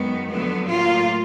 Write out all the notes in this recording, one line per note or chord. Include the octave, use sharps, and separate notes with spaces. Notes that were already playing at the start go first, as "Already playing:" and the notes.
Already playing: F#2 D#3 G#3 B3
F2 D3 F#3 A3 B3
A2 F#3 A#3 F4